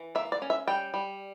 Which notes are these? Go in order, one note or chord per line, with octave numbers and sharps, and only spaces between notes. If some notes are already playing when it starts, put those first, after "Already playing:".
Already playing: E3
A#3 E5
D5
C#4
E5
G3 G5
G3